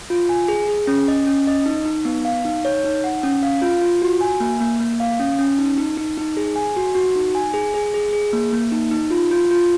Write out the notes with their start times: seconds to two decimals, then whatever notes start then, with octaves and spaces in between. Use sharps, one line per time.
0.10 F4
0.29 G#5
0.48 G#4
0.68 G#4
0.87 C#4
1.08 D#5
1.27 C#4
1.47 D#5
1.66 D#4
1.85 D#4
2.05 B3
2.25 F5
2.45 D#4
2.65 C#5
2.84 D#4
3.04 F#5
3.23 C#4
3.43 F5
3.62 F4
3.82 F4
4.02 F#4
4.21 G#5
4.40 A#3
4.60 A#3
4.80 A#3
5.00 F5
5.20 C#4
5.39 C#4
5.58 D#4
5.78 D#4
5.97 D#4
6.18 D#4
6.37 G#4
6.56 G#5
6.76 F#4
6.95 F#4
7.16 D#4
7.35 G#5
7.54 G#4
7.74 G#4
7.94 G#4
8.13 G#4
8.33 A#3
8.52 A#3
8.72 D#4
8.91 D#4
9.10 F4
9.31 F4
9.51 F4